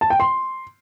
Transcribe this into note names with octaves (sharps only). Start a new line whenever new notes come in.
A5
G5
C6